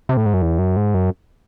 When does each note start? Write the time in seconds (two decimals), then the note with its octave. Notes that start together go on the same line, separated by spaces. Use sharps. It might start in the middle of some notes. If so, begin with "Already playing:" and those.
0.09 C3
0.17 A2
0.26 G#2
0.34 F#2
0.42 E2
0.59 F#2
0.77 G#2
0.94 F#2